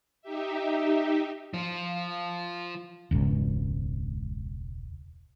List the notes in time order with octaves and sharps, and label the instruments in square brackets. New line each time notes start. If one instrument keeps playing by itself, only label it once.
[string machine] D#4 G4 E5
[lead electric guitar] F3 F4
[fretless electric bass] E1 C#2 G#2 C#3